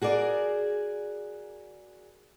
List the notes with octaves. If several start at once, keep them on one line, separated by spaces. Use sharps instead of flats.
F#4 G#4 A#4 D5